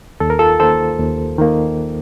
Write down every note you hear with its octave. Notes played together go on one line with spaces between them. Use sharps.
D#2 A4
A#4
F4 A4
D#3 A#3 A4 C5
D#2
D#3 A#3